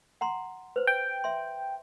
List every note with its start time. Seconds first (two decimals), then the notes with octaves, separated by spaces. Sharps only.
0.21 F#5 A#5 C6
0.76 B4 C5
0.87 G5
1.24 E5 C6